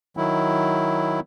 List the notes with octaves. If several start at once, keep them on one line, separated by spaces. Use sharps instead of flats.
D#3 F#3 E4